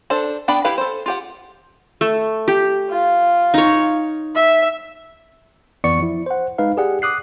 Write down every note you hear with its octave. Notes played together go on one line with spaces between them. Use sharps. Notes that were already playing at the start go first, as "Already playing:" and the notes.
D4 A4 C5
B3 D4 D5 G5 B5
E4 G4 B4 F5
A4 C5
F4 G4 F#5
A3
G4
F4
D#4 C#5
E5
F2 E3 B3 D5 C#6 C#7
F3 E4
C5 F#5
G#3 D#4 B4 F5
G4 G#4 D5 F#5
D6 D#6 F#6 C7